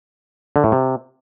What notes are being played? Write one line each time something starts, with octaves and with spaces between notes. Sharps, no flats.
D3
A2
C3